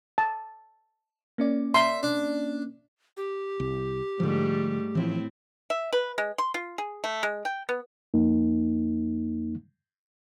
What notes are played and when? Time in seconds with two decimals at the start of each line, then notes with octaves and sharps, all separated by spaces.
0.18 A5
1.38 A#3 C#4 D5
1.74 E5 A#5 C6
2.03 D4
3.17 G4
3.60 C2
4.20 G#2 D3 F3 G3 A3
4.95 A2 E3 F3 C4 E4
5.70 E5
5.93 B4
6.18 G#3
6.38 C6
6.54 F4
6.78 G#4
7.04 A3
7.23 G#3
7.45 G5
7.69 B3
8.14 F2 A#3 D#4